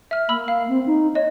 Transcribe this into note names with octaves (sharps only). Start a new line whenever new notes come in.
E5 F6
A#3 B5 E6
F5
C4
D#4
C#5 D#5